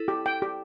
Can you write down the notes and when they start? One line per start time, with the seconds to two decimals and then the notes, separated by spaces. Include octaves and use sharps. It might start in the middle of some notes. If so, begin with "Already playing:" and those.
Already playing: E4 A4
0.08 G4
0.26 G5
0.42 G4